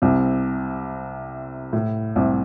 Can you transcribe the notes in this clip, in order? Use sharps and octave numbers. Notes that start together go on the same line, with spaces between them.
C2 C3
A2
C2 C3